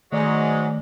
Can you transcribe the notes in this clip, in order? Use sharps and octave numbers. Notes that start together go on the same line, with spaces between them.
G#2 D#3 F#3 G#3 A3 D5